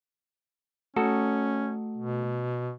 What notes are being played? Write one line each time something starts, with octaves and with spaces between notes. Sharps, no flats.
A3 C#4 F#4 A4
B2